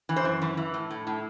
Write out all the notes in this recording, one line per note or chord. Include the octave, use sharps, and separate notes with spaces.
E3
C5
F#2
E3
E3
A2
A2
A2